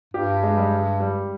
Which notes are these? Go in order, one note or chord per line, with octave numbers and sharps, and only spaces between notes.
G2 G4
G#3
G3
G3